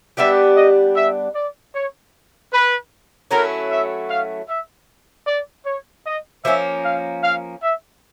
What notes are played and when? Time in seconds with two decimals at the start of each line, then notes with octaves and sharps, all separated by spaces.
0.17 G3 B3 D4 G4 E5
0.56 D#5
0.95 E5
1.35 D5
1.74 C#5
2.52 B4
3.31 F#3 A3 C#4 E4 A#4
3.70 E5
4.09 F5
4.48 E5
5.27 D5
5.66 C#5
6.05 D#5
6.44 F3 A#3 C#4 E5
6.84 F5
7.23 F5
7.62 E5